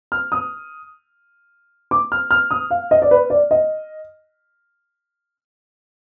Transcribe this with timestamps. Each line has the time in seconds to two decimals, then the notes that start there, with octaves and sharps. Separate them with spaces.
0.12 F6
0.32 D#6
1.91 D6
2.12 F6
2.31 F6
2.51 D#6
2.71 F5
2.91 D#5
3.02 D5
3.11 B4
3.30 D5
3.51 D#5